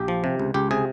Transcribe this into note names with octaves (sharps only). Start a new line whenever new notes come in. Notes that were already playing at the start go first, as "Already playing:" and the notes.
Already playing: A#1 G4
F3
C3
C#2
C#2 G4
C3 G#4